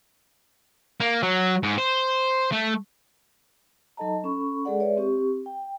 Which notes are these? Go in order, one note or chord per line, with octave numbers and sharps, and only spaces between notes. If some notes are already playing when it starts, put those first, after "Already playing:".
A#3
F#3
G#2
C5
A3
F#3 D#4 A4 D#5 A5 A#5
C#4 A4 B5 C#6
G#3 G#4 A4 D5 F#5
G#3 G#4 B4 C#5 D5 E5
C4 G4 C#6
G5